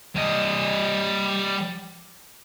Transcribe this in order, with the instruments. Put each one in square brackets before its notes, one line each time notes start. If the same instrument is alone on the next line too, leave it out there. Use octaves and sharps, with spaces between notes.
[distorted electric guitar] G3 D#5